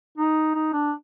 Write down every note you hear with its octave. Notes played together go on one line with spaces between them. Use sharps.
D#4
D#4
D4